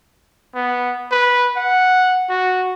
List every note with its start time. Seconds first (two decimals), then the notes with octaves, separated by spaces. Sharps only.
0.55 B3
1.12 B4
1.56 F#5
2.29 F#4